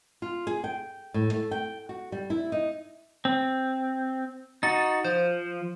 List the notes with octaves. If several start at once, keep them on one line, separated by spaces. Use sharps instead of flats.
F4
G#4
G5
A2
A3
G5
F#4
G3
E4
D#4
C4
D#4 F#4 A6
F3 C5